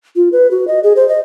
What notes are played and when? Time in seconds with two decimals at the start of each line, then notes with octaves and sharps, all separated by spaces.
0.16 F4
0.32 B4
0.51 F#4
0.68 D#5
0.84 G#4
0.96 C5
1.09 D#5